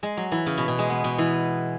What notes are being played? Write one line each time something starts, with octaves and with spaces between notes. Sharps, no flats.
G#3
F#3
E3
C#3
B2
B2
G#3
B3
B2
E3